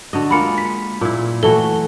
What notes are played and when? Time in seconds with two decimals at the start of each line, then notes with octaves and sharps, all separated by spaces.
0.13 D3 F#4 D#5
0.31 G#3 A#3 F4 B5 C#7
0.58 B6
1.01 A#2 E4
1.43 E3 A3 F#4 A4 G7